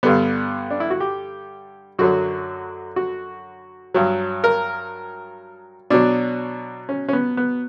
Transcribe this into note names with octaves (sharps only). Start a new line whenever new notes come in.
G2 D3 G3 B3
D4
E4
F#4
G4
F#2 D3 F#3 F#4
F#4
G2 F#3
A#4
B2 F#3 D4
C#4
C#4
B3
B3